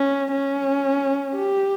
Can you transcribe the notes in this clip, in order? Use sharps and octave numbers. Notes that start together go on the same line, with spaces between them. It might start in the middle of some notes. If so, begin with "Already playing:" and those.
Already playing: C#4
C#4
G4